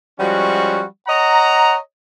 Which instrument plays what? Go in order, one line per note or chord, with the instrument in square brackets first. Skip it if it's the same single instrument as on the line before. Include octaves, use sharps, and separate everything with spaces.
[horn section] F3 G3 G#3 C#4 F#4
C#5 D#5 F#5 A#5